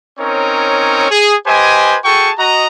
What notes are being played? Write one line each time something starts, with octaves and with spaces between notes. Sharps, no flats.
C4 C#4 D#4 A#4 C#5
G#4
G4 B4 C5 D#5 G#5
F#4 G#4 A4 G5 A5 C#6
F#4 D#5 A#5